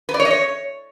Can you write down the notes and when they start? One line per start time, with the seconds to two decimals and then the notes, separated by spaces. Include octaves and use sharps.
0.09 B4
0.14 D5
0.20 C#5
0.25 D#5
0.31 C#5